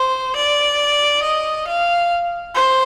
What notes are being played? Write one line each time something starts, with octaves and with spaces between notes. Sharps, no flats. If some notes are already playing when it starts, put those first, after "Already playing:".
Already playing: C5
D5
D#5
F5
C5